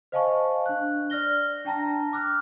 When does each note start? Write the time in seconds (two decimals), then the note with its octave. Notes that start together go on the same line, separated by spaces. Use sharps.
0.12 C5 D#5 F5 G#5 A5 C#6
0.66 D4 F#6
1.10 D5 F6 A#6 G7
1.65 D4 G5 A5 A#5 A#6
2.13 D6 F6 F#6